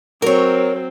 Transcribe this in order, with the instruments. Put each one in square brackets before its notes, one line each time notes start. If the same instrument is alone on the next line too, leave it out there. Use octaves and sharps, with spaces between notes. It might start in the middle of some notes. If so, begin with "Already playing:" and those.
[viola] F#3 C4 [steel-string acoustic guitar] A#4 C#5